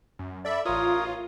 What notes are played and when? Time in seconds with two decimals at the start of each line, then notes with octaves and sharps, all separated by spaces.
0.19 F#2
0.45 A4 D5 E5 B5
0.65 A1 F4 A#4 C#5 D#6